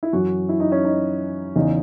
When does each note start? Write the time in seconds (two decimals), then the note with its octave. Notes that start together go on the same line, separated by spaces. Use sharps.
0.03 E4
0.13 F#2 E3 F#4
0.49 E4
0.60 D#4
0.72 C#4
0.85 D#4
1.56 E2 C#3 E3 D#4